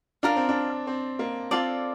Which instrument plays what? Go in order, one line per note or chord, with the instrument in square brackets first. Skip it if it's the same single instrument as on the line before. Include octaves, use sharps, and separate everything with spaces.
[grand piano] D4 [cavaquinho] F4 A#4 F5
[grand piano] C4
D4
C4
A#3
[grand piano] C4 [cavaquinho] F4 A4 D5